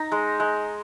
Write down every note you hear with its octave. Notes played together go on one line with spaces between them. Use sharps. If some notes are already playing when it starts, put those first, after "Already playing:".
Already playing: D#4 A#5
G#3
G#3